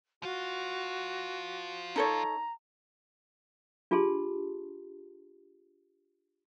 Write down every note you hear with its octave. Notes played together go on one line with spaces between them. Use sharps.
F3 F4 F#4
D#4 A4 C#5 A#5
D4 F4 G4 G#4 A5 C6